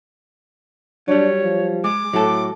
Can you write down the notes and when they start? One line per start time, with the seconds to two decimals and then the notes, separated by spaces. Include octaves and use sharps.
1.08 F#3 G3 D4 C#5
1.42 F3
1.84 G#3 D6
2.13 A2 F#3 A4